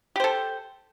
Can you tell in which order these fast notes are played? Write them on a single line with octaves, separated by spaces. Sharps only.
G4 C5 A4